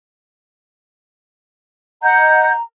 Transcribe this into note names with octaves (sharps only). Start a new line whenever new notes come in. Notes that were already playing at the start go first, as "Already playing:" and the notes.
D#5 F#5 A#5 G6